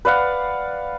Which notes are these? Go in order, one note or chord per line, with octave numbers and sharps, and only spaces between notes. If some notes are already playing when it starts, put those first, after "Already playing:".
B4 D5 F5 F#5